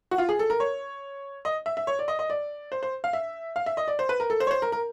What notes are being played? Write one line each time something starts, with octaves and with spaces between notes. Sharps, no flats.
F#4
F4
G#4
A4
A#4
C#5
D#5
E5
E5
C#5
D5
D#5
D#5
D5
C5
C5
F5
E5
F5
E5
D#5
D5
C5
B4
A#4
A4
C5
C#5
C5
A#4
A#4